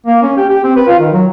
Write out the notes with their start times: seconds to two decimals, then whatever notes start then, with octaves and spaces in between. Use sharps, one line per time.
0.06 A#3
0.23 C#4
0.37 G4
0.50 G4
0.64 C4
0.76 B4
0.88 F4
0.99 D#3
1.13 F#3